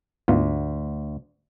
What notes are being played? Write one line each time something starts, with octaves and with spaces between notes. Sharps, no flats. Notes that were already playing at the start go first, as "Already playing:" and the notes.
D2 G#2 B3 F4